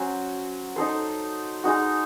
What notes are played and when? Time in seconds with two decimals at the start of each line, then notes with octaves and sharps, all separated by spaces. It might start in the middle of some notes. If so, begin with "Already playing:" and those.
Already playing: F#3 C#4 F#4 C5
0.76 D#4 A4 C5
1.64 G#3 D#4 F#4